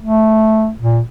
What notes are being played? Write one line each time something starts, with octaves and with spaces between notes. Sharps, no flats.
A3
A#2